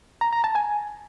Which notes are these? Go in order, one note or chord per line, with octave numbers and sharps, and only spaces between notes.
A#5
A#5
A5
G#5